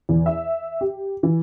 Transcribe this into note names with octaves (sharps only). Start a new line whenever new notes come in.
E2
E5
G4
E3